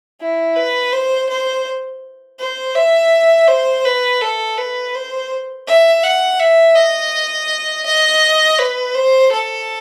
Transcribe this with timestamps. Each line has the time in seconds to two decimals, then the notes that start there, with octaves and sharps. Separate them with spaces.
0.21 E4
0.56 B4
0.93 C5
1.29 C5
2.39 C5
2.75 E5
3.48 C5
3.85 B4
4.21 A4
4.58 B4
4.95 C5
5.67 E5
6.04 F#5
6.40 E5
6.76 D#5
7.86 D#5
8.59 B4
8.95 C5
9.32 A4